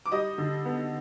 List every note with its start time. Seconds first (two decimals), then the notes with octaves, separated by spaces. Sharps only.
0.06 D6
0.12 G3 D#5 D#6
0.38 D3
0.65 B3